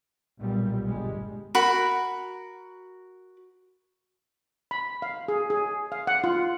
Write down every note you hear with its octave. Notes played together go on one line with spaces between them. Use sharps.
B1 A#2 G3
G1 G3 G#3
F#4 A#4 B5
B5
F5
G#4
G#4
F5
F#5
F4